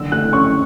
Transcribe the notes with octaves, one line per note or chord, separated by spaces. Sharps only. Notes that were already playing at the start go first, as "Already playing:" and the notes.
Already playing: F#1 D3 E6
A3 F#6
C#4 C#6